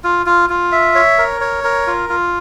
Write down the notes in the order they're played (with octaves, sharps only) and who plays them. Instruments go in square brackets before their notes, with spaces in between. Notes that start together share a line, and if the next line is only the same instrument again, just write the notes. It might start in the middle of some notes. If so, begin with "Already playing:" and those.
[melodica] F4
F4
F4
E5
C#5
A#4
C#5
A#4
F4
F4